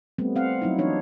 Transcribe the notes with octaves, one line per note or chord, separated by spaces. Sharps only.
G3 A3 B3 C4
C4 F5 F#5
F#3 D#4 E4
E3 D4 D#4 C#5